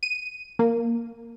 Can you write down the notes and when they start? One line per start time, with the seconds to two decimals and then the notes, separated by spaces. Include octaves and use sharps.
0.03 D#7
0.59 A#3